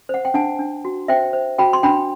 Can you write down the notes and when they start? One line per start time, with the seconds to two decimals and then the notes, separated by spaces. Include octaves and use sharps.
0.09 C5 F#5
0.25 G5
0.34 D4 F#5 A5
0.59 D4
0.85 F#4
1.08 C5 E5 G5
1.33 C5
1.59 F#4 G5 B5
1.73 C6
1.83 D4 G5 B5